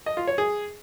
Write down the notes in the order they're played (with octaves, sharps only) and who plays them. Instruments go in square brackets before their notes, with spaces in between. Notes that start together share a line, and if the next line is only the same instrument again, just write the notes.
[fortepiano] D#5
F4
C#5
G#4